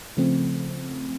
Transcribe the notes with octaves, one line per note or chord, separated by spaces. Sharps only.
C#3 F3 A3 C4